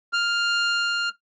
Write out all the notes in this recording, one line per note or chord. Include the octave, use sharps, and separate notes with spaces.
F6